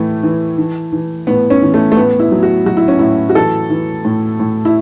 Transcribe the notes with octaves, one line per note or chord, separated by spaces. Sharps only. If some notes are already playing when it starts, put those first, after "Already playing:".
Already playing: A2 E3 A3
E3
E3
E3
A2 B3
C#4
E3
A3
A3
A2 B3
E4
F#3
F#4
F#3 F#4
E4
C#4
A2 E4
F#4
E3 A4
E3
A2
A2
E4